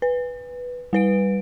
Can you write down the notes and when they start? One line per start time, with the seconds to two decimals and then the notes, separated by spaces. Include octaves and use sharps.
0.02 B4
0.93 G3 B4 D7